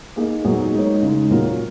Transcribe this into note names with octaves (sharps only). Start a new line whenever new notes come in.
A#3 D#4 G#4 D#5
A#2 F#3 B3 D#4 G#4
G#3 D#4 A#4 C#5
C#3 G#3 D#4
A#2 F#3 C#4 F4 A#4